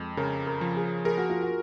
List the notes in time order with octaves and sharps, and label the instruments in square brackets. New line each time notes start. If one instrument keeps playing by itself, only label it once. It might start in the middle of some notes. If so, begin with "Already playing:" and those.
Already playing: [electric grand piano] F2 G#3
[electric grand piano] C#3 [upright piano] A#4
[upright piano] A#4
[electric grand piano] F3
[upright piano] G#4
[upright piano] G#4 [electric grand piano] A#4
[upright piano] F#4
F4
F#4